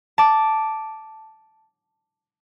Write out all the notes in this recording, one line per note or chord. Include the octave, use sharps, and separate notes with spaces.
A5 D6